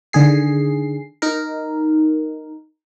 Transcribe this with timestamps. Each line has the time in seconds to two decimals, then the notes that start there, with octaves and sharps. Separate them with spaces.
0.13 D3 D#3 G#4 C7
1.22 D#4 A#4